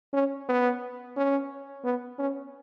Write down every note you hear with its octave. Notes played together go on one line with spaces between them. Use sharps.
C#4
B3
C#4
B3
C#4